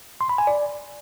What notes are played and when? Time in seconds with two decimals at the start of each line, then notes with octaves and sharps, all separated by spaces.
0.21 C6
0.29 B5
0.38 G#5
0.47 D5